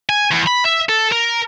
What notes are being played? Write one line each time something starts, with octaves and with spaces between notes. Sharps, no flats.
G#5
E2
B5
E5
A4
A#4